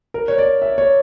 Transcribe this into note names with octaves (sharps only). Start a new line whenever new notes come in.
A#4
C#5
D5
E5
C#5